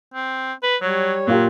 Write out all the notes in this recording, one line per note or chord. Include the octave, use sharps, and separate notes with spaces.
C4
B4
F#3 G3 C#5
A#2 F#3 F4 G4